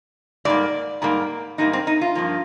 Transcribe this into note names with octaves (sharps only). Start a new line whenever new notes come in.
G#2 G3 A#3 D5
G#2 G3 A#3
G#2 G3 A#3 D#4
C4
D#4
F4
G2 F3 A#3